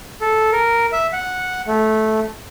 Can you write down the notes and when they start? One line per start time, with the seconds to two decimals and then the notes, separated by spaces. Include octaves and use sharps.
0.21 A4
0.52 A#4
0.93 E5
1.13 F#5
1.67 A3